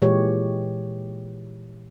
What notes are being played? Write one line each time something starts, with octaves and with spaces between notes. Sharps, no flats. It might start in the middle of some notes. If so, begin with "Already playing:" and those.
A#2 E3 G#3 G4 C#5